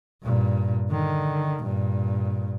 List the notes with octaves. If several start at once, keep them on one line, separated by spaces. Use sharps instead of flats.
G2 A#2
D3 D#3
G2 A#2